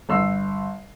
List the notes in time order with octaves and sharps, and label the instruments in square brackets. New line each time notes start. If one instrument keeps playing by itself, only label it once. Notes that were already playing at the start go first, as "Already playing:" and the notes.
[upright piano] G1 E6 C7